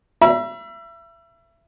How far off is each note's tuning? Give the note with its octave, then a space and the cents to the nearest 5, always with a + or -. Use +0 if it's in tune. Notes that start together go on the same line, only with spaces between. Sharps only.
E5 +30 B5 -40